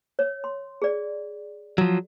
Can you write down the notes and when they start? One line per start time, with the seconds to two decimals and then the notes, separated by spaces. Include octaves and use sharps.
0.19 C#5
0.44 C6
0.82 G#4 D5
1.78 F3 F#3